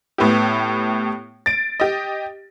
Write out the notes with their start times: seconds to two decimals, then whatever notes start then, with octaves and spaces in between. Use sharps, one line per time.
0.18 A2 B3 E4 G4
1.46 A6 D7
1.80 G4 D#5